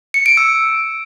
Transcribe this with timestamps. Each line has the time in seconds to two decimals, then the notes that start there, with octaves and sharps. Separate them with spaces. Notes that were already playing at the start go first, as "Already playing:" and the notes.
0.14 C#7
0.26 D7
0.37 E6